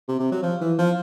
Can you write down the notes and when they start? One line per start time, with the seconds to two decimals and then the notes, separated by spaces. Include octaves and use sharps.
0.08 C3
0.19 C3
0.31 F#3
0.43 F3
0.61 E3
0.78 F3